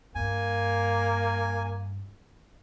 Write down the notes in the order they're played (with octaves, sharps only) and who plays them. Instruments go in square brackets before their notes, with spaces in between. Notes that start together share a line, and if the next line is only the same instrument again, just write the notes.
[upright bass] G2 [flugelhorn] A#3 [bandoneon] G#5